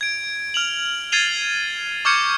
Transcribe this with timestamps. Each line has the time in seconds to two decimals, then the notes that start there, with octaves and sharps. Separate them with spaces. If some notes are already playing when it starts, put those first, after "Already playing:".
0.01 G#6 D7
0.54 F6 F7 F#7
1.12 G#6 A6 C7 D#7 F7 G7
2.05 C#6 D6 F6 G6 G#6 C#7